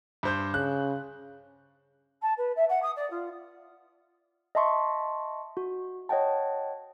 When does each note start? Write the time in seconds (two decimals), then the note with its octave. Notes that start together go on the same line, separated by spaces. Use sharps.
0.23 G2 C5 G6
0.54 C#3 F#6
2.22 A5
2.37 B4
2.56 E5
2.69 F#5
2.82 D#6
2.96 D5
3.10 F4
4.55 D#5 E5 A5 C6 C#6
5.57 F#4
6.09 C#5 D#5 F#5 G5 A5